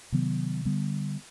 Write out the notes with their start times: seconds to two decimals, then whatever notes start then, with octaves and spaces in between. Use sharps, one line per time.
0.12 C3 D#3 F#3 B3
0.65 D3 G3 B3